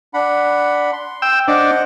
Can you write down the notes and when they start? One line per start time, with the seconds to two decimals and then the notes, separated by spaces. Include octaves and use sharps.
0.14 D4 F#5 B5
0.93 C6
1.22 G5 E6
1.48 D4 C5 D#5 F#5